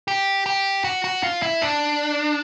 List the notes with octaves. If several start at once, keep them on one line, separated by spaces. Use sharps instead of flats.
G4
G4
F#4
F#4
F4
E4
D4